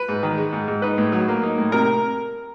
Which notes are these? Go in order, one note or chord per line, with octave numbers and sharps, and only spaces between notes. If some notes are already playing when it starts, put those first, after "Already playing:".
Already playing: B4
G#2
D#3
G#3
G#2
G#2
D#4 B4
A2
F#3
A#3
D#4
A2
C3 A#4